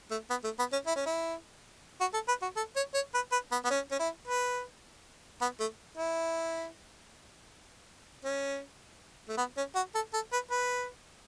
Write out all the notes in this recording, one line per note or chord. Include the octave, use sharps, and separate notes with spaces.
A3
B3
A3
B3
C#4
E4
C#4
E4
F#4
A4
B4
F#4
A4
C#5
C#5
B4
B4
B3
B3
C#4
C#4
E4
B4
B3
A3
E4
C#4
A3
B3
C#4
F#4
A4
A4
B4
B4